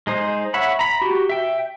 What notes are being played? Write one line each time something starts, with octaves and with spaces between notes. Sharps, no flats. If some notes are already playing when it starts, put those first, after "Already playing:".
G#3 D#4 C5
C#5 E5 F#5 B5
A#5 B5
F#4 G4
E5 G5